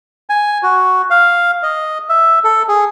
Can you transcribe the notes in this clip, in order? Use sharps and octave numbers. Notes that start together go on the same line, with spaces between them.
G#5
F#4
F5
D#5
E5
A4
G#4